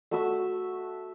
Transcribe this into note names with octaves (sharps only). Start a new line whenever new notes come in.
A3 F#4 E5